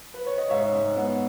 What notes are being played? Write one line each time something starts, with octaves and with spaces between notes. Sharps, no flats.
B4
C#5
D#5
G#2 C#5 E5
G#2
B3